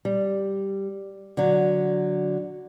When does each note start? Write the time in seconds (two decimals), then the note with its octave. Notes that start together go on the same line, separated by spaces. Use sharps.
0.05 G3
1.37 D3 F#3